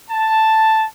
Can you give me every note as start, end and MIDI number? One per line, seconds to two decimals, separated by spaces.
0.10 0.85 81